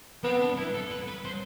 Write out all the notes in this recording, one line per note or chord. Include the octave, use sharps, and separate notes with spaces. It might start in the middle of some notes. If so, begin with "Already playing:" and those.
B3 C4
D4
E4
A4
B4
B4
C5